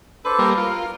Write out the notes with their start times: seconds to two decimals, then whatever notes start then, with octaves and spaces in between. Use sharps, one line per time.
0.25 D4 A4 B4 C5
0.39 G3 A#3
0.57 F4 A#4